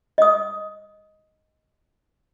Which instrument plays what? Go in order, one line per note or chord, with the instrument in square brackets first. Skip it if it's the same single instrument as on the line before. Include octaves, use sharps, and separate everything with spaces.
[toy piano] D#5 D#6